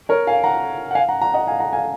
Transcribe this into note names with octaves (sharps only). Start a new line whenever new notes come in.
A#4 C#5
F5 G#5
F#5 A#5
F#5
F5 G#5
F#5 A#5
F#5 A#5
D#5 F#5
F5 G#5
F#5 A#5
F5 G#5